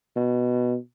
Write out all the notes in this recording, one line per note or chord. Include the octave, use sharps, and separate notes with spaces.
B2